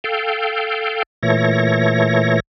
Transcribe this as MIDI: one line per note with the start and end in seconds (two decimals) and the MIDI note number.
0.04 1.03 69
0.04 1.03 77
0.04 1.03 79
1.23 2.40 46
1.23 2.40 52
1.23 2.40 57
1.23 2.40 73
1.23 2.40 94